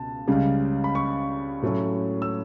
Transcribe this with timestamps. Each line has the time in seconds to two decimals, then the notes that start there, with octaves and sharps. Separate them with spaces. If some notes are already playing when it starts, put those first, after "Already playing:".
Already playing: C#2 B2 A5
0.27 C#2 C#3 G3
0.84 B5
0.95 C#6
1.62 A2 F#3 A3 C#4
2.22 E6